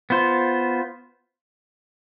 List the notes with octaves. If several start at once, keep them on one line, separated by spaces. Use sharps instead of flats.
B3 F4 C5